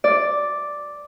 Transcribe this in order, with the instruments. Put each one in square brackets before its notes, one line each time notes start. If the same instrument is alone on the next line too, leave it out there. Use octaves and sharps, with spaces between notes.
[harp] D5